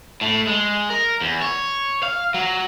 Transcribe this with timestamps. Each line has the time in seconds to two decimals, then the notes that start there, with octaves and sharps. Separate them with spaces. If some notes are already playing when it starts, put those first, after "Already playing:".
0.21 A2
0.47 G#3
0.90 A#4
1.21 E2
1.42 C#5
2.03 F5
2.34 F#3